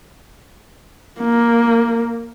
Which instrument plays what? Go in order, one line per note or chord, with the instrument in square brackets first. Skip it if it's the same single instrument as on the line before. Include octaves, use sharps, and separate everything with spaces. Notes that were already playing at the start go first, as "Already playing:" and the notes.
[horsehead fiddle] A#3